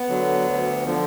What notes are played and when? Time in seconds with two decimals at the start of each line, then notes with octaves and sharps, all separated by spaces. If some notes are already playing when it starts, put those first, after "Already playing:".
Already playing: B3
0.09 D3 F#3
0.46 D2
0.85 D3 F3